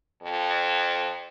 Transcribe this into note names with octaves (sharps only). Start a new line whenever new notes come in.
F2